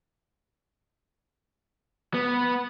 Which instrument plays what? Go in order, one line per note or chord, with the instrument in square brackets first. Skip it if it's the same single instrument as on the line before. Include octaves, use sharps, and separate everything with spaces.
[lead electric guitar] B3